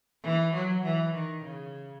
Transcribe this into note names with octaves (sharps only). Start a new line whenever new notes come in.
E3
F#3
E3
D#3
C#3